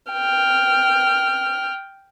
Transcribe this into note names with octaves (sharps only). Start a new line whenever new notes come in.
G5 F6